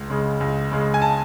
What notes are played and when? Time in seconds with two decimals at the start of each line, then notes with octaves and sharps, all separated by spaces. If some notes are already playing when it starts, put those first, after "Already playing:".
Already playing: C#2
0.10 C#3 G#3
0.40 C#2
0.72 C#3 G#3
0.94 G#5
1.02 A5